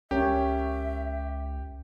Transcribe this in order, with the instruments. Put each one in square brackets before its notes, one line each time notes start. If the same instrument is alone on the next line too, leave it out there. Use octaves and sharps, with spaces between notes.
[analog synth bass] C#2 [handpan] C#4 A#4 C#5 [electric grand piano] G4 [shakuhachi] E5